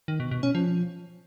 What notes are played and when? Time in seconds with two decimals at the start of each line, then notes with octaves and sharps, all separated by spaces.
0.08 D#3
0.20 B2
0.31 B2
0.43 C#4
0.55 F3